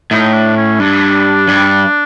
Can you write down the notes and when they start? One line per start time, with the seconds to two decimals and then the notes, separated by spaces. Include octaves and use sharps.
0.11 A2 D#4
0.33 D4
0.57 C#4
0.80 G2 D4
1.48 G2